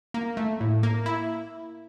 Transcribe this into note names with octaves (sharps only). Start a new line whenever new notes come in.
A#3
A3
A2
A#3
E4